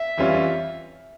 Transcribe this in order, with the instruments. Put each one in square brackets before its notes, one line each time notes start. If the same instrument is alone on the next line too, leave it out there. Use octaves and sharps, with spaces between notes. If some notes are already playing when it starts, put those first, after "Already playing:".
Already playing: [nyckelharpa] E5
[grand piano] F2 E3 G3 C#4 F4